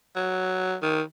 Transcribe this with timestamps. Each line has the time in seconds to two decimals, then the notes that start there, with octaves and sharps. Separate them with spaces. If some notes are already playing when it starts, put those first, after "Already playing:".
0.16 F#3
0.82 D#3